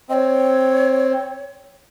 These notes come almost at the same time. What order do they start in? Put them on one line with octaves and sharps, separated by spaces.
C4 D#5 C#5